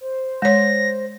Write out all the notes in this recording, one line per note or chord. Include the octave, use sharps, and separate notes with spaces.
C5
G#3 C5 C#5 A#6